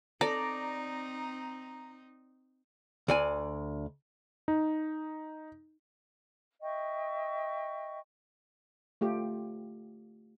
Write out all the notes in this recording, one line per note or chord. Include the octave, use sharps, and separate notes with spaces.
C4 D#4 A4 D5 A#5
D2 D5 G#5
D#4
D#5 E5 G5 C#6
A3 F4 G4